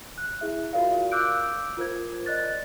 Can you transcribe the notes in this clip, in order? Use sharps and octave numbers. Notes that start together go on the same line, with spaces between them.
F#6
E4 G#4 E5
F4 F#4 A#4 D5 F5
D6 E6 F#6 G6 D7
F4 A#4 C5 G#6
D5 D#5 F#6 A6